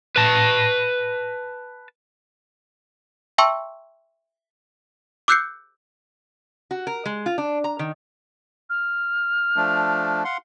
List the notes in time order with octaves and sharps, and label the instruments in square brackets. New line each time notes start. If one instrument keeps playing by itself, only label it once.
[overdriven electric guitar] B4 A5
[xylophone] E5 G5 A5 C6 C#6 E6
D6 E6 F#6 G6 C7 C#7
[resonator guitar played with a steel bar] F#4
A#4
G#3
F4
D4
A#5
D#3
[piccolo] F6
[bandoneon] F3 A3 D4
F5 F#5 C6